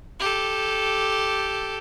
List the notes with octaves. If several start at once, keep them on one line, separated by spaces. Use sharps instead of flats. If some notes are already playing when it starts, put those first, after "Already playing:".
G4 A4